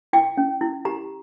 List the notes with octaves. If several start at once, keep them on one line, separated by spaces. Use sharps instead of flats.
E4 G5
C#4
E4
G4 A#5